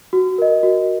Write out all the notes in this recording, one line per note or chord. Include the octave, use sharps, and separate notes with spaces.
F#4
A#4 D#5
F#4